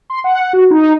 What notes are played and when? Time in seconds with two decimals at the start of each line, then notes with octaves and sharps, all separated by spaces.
0.10 C6
0.24 F#5
0.53 F#4
0.71 D#4